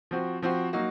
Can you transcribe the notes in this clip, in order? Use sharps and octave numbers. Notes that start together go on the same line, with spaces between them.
F3 C4 F#4
F3 C4 F#4
F#3 A#3 D#4 F#4